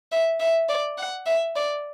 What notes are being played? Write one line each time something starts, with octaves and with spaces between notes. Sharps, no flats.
E5
E5
D5
F#5
E5
D5